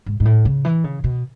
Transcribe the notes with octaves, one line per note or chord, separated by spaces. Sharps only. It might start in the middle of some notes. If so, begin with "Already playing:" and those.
G#2
G#2
A2
C#3
E3
C#3
B2